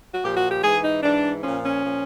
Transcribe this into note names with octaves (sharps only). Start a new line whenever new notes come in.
F#4
A#2 F3 G4
F#4
G4
G#2 E3 G#4
D#4
G#2 E3 D4
A#2 F3 C#4
C#4
A#2 F3